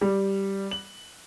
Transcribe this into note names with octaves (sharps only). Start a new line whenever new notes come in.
G3
F#7